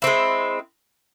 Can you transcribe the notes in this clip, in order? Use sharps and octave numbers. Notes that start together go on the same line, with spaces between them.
G#3 C4 E4